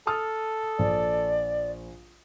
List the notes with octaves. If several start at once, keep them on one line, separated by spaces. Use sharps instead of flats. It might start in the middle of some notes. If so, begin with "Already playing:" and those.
A4 A5 D#6 F6
A#1 D5